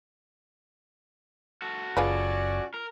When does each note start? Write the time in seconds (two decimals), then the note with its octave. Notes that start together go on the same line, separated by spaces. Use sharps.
1.62 F#4 A4
1.97 F#1 C#4 F4 G#4 B4 D5
2.74 A#4